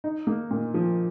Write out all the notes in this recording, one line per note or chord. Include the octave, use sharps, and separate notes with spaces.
D#4
A#3
A#2
F3